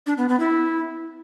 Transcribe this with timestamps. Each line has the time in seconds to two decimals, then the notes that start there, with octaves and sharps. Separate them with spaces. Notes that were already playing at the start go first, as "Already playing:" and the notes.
0.07 D4
0.18 B3
0.29 B3
0.40 E4